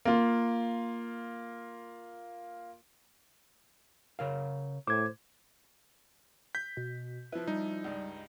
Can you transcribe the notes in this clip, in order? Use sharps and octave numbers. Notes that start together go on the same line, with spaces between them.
A#3 F4
C#3 A#4 F5
A2 C5 D6 G#6
G6 B6
B2
F3 E4 B4
G3 D#4
C#2 G2